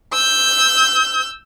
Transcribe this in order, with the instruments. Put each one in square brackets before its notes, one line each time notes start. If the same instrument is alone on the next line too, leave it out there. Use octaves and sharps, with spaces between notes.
[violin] E6 G6